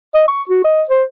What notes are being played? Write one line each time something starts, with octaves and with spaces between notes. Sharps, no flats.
D#5
C#6
F#4
D#5
C5